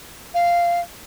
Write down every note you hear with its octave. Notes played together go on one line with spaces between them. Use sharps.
F5